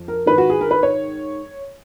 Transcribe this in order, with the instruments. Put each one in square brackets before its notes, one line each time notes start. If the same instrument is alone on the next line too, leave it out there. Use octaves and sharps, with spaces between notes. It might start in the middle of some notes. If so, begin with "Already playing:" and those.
Already playing: [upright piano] F2
A#4
G#2 D#3 B4
F#4
G#4
A#4
B4
C#5